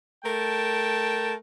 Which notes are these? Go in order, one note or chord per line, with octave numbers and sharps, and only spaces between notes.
A3 A#4 G5 A5